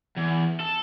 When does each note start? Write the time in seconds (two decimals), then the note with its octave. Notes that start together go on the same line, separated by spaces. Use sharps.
0.16 E2
0.60 A4